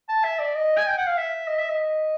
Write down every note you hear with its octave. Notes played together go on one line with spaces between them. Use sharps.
A5
E5
D5
D#5
G#5
G5
F#5
F5
E5
D#5
E5
D#5